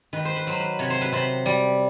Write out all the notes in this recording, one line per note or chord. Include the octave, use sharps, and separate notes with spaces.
D#3 B4
C5
B4
F#3 C5
B4
C3 C#5
C5
B4
C3 C5
G3